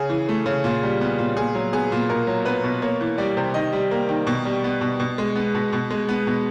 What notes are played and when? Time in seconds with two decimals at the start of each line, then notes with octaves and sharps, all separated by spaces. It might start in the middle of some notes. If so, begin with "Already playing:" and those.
Already playing: C#3 G#4
0.10 E3
0.29 A3
0.46 C#3
0.64 A#2
0.83 G3
1.01 B3
1.19 A#2
1.37 A#2 G#4
1.55 F#3
1.73 B3 G#4
1.92 A#2
2.09 B2 A#4
2.27 F#3
2.45 B3 B4
2.64 B2
2.82 A#3 C#5
3.01 E3
3.18 G3 D5
3.37 C3
3.54 D#3 D#5
3.73 G3
3.91 A#3
4.09 D#3
4.27 B2
4.45 G3
4.64 B3
4.81 B2
5.00 B2
5.18 G#3
5.36 B3
5.55 B2
5.73 B2
5.91 G#3
6.09 B3
6.27 B2